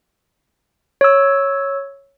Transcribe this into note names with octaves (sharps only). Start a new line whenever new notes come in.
C#5 E6